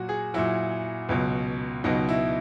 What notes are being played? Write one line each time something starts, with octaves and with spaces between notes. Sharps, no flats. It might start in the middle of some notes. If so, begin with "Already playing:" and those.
Already playing: A#2 F#3 F#4
G#4
A#2 F#3 E4
C#2 B2 F#3
C#2 B2 F#3 D#4
E4